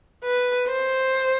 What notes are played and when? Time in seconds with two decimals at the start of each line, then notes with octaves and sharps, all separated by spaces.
0.24 B4
0.68 C5